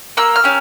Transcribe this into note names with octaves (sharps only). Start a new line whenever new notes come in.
A#3 E6
F6
C#4 G4